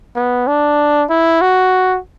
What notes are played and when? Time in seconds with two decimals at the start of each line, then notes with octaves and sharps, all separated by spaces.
0.16 B3
0.48 D4
1.10 E4
1.41 F#4